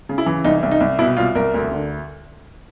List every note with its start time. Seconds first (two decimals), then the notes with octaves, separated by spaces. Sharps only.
0.09 C#3
0.18 E4
0.26 E3
0.44 C2 D#4
0.63 C2
0.71 D#4
0.80 C2
0.99 B2 E4
1.17 C2 F4
1.35 C2 A#4
1.54 D2
1.71 D3